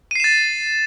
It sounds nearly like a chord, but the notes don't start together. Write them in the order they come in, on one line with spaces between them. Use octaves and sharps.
D#7 C7 E7 A6